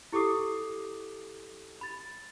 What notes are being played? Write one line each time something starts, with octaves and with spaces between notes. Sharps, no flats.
E4 G4 A4 D6 D#6 C7
B5 A6